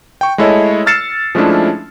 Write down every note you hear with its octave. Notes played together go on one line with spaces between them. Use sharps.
G5 C#6
G#3 A3 E4 A4 C#5 D#5
E6 F6 A6 C7 C#7 E7
F3 G#3 A3 C#4 D4 E4